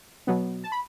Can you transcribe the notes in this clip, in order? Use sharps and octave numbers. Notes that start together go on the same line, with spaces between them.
B2 F#3 B3
A5
B5